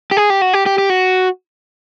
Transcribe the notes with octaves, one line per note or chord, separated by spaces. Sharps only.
G4
G#4
G4
F#4
G4
G4
G4
F#4